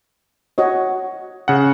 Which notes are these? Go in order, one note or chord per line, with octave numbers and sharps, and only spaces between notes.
F#4 C#5 D#5
C#3 F#5